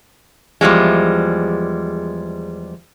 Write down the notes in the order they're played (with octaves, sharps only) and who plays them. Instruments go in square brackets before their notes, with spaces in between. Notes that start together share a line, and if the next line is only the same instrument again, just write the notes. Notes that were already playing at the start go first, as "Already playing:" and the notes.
[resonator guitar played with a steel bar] E2 F3 G3 G#3